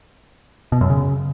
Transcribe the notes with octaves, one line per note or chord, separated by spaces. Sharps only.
B2
F#2
C#3